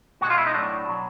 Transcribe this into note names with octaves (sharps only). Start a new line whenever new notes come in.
B2 G#3 F#4
F4
E4
D#4
A2 F#3 D4
B2 F#3